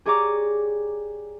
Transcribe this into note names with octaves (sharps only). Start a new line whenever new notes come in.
G4 G#4 C#5 D5 A#5 D6